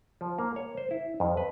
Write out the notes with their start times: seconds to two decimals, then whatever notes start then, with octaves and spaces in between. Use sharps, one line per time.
0.21 F3
0.39 A#3
0.56 C#5
0.77 C5
0.91 E4
1.20 F2
1.37 B4